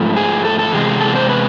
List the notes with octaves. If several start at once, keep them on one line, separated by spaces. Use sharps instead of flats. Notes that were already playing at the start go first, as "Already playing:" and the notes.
Already playing: G#2 F3 A3
G#4
A4
A4
E2 C3 G#3 G#4
A4
C5
B4